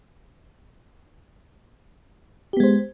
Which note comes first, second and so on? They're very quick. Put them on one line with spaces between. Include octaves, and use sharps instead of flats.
G4 B3 G#3 C5